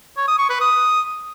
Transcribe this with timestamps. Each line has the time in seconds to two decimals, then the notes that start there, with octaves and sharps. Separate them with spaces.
0.17 C#5
0.28 D#6
0.39 C#6
0.50 B4
0.61 D#6